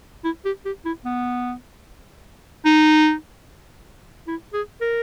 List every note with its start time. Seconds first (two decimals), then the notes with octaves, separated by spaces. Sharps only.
0.24 E4
0.45 G4
0.65 G4
0.86 E4
1.05 B3
2.65 D#4
4.27 E4
4.53 G#4
4.81 A#4